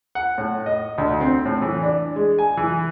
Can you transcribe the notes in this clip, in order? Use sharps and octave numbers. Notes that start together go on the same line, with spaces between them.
F#5
A2
D#5
D2
C4
A2
E3
D4
G#3
G#5
E3